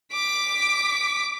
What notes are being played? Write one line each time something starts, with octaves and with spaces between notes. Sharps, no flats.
D6 B6